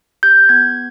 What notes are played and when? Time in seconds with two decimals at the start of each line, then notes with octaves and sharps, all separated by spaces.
0.23 G4 G6
0.49 B3 G#6